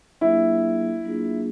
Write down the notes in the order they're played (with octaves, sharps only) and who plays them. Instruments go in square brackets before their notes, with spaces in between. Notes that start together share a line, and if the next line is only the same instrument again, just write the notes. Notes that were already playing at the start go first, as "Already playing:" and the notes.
[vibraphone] F#3 A#3 D4 F4 G#4 [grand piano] E4
[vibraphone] F#3 A#3 D4 F4 G#4